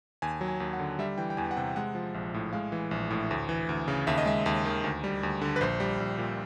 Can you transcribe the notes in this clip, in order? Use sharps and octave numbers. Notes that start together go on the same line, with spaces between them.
D#2 G#5
F#3
G#5
D#2
F#5
D3
G3 E5
E3 G5
G5
E2 G#5
F#5
C3 G5
G#3 F#5
F3
A#1
A2
G#3 F5
E3
A#1
A2
D2
E3
D2
C#3
D#2 E5
D#5
G#3 E5
D#2
D#3
D2
G3
D2
D3
B4
A#1 C5
G3
A#1
A#2